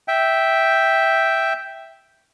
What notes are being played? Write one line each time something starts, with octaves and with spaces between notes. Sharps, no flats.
E5 G5